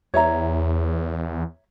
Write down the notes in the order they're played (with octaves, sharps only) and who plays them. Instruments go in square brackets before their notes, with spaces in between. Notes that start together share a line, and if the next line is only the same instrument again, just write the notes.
[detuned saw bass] E2 [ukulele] C#5 E5 A#5